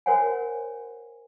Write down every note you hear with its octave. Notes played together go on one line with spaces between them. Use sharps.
F#4 A#4 C5 C#5 F#5 G#5